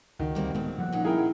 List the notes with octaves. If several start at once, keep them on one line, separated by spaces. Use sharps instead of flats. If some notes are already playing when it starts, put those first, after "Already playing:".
C#2 D#3 F#4
D2 G3 A#3 C4
D1 D2 G#3 B3 C4
F3 G3 A#3 F#5
A#2 D#3 C#4 F#5
E4 G#4 A#4 G5